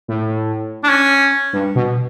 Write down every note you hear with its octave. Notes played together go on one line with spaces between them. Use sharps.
A2
D4
C#4
G2
B2